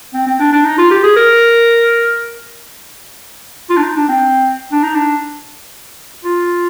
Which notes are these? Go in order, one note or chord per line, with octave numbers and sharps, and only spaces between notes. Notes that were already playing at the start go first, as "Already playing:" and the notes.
C4
C4
D4
D4
D#4
F4
G4
G#4
A#4
F4
D4
D#4
D4
C4
D4
D#4
D4
F4